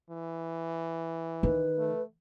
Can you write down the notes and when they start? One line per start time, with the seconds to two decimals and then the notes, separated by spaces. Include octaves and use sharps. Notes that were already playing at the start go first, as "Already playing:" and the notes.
0.10 E3
1.43 D#3 B4
1.78 A3